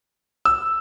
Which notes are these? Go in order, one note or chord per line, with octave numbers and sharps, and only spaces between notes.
E6